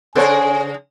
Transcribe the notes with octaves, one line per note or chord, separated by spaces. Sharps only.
C#3 G#4 A4 C5 C#5 G#5